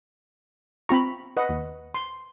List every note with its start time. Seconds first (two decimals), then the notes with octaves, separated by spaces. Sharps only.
0.89 C4 F4 A#5 B5 C#6
1.37 B4 D#5 F#5
1.49 D#2
1.94 C6